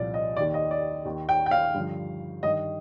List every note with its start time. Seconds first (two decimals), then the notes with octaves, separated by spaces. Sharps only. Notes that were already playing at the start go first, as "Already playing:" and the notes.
Already playing: C2 A#2 F3 D5
0.14 D#5
0.37 D#2 D#3 D5
0.54 D#5
0.71 D5
1.05 D#2 D#3
1.29 G5
1.46 G5
1.51 F5
1.74 G2 D3 F3
2.43 G2 D#3 D#5